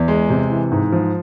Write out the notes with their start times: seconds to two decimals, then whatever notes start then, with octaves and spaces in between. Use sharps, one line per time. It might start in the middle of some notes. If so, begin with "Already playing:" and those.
Already playing: E2
0.08 G#3
0.30 C3
0.50 E3
0.72 G#2
0.92 F3